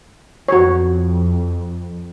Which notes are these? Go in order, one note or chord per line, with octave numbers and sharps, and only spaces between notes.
F2 F#4 C#5